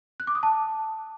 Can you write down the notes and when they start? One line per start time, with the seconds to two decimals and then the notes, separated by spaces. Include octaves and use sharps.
0.20 F#6
0.27 D6
0.35 D#6
0.43 A5